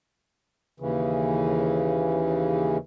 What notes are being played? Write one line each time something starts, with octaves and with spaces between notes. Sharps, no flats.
D#2 C#3 E3